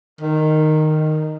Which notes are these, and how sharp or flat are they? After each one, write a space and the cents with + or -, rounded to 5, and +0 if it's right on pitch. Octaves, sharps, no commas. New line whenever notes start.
D#3 -10